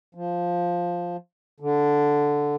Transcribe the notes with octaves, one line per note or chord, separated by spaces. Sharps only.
F3
D3